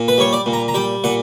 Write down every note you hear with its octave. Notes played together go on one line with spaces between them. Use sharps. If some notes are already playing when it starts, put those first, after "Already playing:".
Already playing: A#2
B4
G3 C#5
D5
A#2
A#5
A#5
G3 G5
A#2 F#5